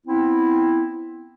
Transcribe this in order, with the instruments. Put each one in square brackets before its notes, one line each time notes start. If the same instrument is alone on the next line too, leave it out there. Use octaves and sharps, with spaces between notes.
[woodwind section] B3 C4 E4